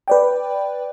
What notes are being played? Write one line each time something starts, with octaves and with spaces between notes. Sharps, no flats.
B4 D5 G5